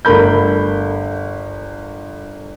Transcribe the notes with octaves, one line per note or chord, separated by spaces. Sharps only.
G1 A3 A#4 B5 G6